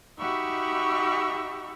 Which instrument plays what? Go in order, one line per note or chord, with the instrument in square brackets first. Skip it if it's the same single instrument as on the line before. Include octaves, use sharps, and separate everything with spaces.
[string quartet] D#4 F#4 G4 E5 B5 C#6